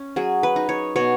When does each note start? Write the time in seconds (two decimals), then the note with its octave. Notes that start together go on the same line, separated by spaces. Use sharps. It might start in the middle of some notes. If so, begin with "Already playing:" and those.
Already playing: C#4
0.16 F#3 G#4
0.43 B4
0.56 D#4
0.69 C#5
0.96 B2 C#5